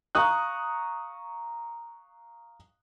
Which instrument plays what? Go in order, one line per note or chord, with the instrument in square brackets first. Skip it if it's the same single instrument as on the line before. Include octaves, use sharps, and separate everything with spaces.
[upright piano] F5 A#5 C#6 D#6 F#6